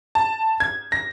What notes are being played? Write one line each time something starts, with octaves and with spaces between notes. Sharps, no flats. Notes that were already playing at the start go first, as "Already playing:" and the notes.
A5
G#6
A#6